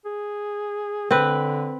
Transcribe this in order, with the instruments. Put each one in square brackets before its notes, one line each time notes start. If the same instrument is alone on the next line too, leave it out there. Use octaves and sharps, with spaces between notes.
[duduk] G#4
[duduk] D3 [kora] C4 B4